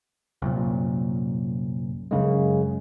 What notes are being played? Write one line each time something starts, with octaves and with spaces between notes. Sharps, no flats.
C2 F#2 A#2
F#2 C#3 G#3